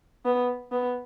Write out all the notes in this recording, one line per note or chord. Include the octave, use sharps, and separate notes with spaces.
B3
B3